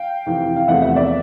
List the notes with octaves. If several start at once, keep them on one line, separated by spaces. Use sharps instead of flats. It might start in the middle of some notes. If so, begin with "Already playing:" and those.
Already playing: F5 G5
F2 C3 E3
F5
E2 C3 F3 A3 E5 F#5
E5 F#5
D5 E5